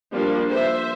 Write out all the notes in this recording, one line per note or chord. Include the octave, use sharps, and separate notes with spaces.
F3 G3 A#3 D4
C5 E5